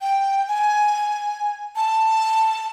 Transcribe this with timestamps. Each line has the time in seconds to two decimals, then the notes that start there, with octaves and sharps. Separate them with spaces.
0.01 G5
0.48 G#5
1.76 A5